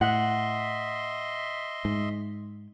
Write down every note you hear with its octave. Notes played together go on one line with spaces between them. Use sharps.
A2 D#5 E5 F#5 C6 F#6
G#2